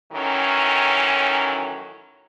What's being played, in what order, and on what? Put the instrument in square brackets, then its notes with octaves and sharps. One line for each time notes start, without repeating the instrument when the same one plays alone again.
[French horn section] A2 D#3 E3 F#3 C#4